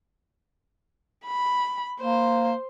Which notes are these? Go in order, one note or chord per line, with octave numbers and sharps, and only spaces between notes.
B5
A#3 C5